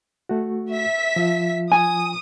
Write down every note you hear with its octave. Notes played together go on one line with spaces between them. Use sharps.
A3 F#4
E5 B6
F3 F4
G#5 D#6